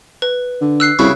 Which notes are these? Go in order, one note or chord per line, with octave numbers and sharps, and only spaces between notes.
B4
D3
E6 F#6 C7
C2 C#3 E4 F#4